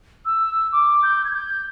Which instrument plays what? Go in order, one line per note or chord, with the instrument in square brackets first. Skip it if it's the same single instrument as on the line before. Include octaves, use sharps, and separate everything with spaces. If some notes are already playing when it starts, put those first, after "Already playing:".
[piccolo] E6
D6
G6
G#6
G6